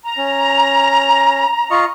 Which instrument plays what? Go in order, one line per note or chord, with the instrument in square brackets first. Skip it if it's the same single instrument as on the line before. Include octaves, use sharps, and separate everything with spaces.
[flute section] A#5
[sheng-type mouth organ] C#4
F4 D#5 C#6